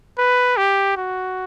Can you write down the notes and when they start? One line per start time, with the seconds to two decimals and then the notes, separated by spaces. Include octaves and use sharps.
0.18 B4
0.57 G4
0.97 F#4